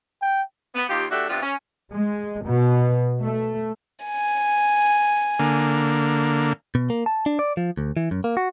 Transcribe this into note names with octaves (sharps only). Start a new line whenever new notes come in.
G5
B3
D#2 F4 G4
A3 D4 F#4 G4 E5
G2 C3 G3 B3 F4
C#4
G#3
B2
A3
G#5
D3 A#3
B2
A#3
A5
D4
D5
F3
D2
E3
F#2
A#3
F#4